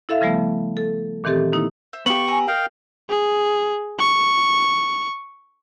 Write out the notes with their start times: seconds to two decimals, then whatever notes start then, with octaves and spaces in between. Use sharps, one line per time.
0.09 E4 A4 E5 F5
0.21 C#3 F3 G3 A3 B3
0.77 A4
1.24 A#2 D#3 E3 C4 G4 A4
1.53 D#3 A#3 D#4 E4
1.93 C5 E5
2.06 B3 G4 A4 E5 F5 C#6 F#7
2.27 E5 G#5 A#5
2.48 F4 A#4 D#5 F5 G5
3.09 G#4
3.98 C#6